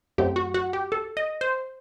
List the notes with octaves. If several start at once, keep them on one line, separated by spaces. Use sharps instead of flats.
F#2 F#3 A3 C4 G4
F#4
F#4
G4
A4
D#5
C5